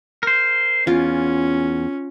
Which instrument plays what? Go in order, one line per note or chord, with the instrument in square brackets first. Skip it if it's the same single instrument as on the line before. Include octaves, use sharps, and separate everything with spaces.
[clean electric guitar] A#4 C5
[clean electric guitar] E2 [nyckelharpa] C#4 [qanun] F4